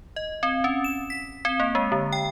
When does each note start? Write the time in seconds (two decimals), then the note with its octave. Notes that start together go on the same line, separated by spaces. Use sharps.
0.16 D#5
0.43 C4
0.64 C#4
0.84 E7
1.10 B6
1.45 C4
1.60 A#3
1.75 G#3
1.92 D3
2.13 G5